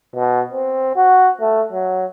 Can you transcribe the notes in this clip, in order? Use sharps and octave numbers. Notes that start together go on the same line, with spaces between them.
B2
C4
F#4
A3
F#3